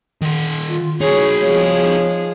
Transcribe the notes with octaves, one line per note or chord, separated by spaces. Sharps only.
D#3 F#5
F4
D#4 F#4 G#4 C#5
F3 G#3 G#4 C#5